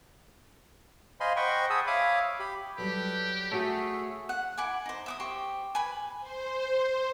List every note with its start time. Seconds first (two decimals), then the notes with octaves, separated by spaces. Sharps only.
1.20 C5 D#5 F5 G#5 B5 C6
1.36 C5 D#5 F#5 G5 B5 C#6
1.70 G#4 A5 B5 D#6 E6
1.87 C#5 E5 F5 B5 D6 D#6
2.40 G4 B5
2.78 F#3 G3 G4 A4 B4 F#6
3.52 A3 F#4 G#4 C#5 E5
4.29 F#5
4.58 E4 F#5 G#5 D6
4.86 D#4 C5
5.06 E5 D6 D#6
5.20 G4 C5 C#6
5.75 B4 G#5
6.21 C5